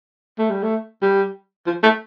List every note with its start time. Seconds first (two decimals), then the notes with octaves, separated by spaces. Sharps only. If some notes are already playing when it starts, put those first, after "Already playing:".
0.39 A3
0.51 G3
0.63 A3
1.03 G3
1.67 F3
1.83 A3